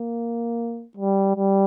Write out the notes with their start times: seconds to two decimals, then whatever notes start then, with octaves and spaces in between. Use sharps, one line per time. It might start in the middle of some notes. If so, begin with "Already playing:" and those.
Already playing: A#3
0.97 G3
1.37 G3